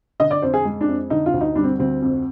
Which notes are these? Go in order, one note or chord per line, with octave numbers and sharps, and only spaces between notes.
D3 D#5
D5
F2 C5
G#4
G#3
D4
F2
D3 D#4
F4
D2
D#4
G3 D4
C4
D2 C4
F2